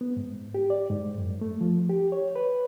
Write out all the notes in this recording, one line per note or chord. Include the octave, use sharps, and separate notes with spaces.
B3
G#2
G4
D5
G#2
F#2
A3
F3
G4
C#5
B4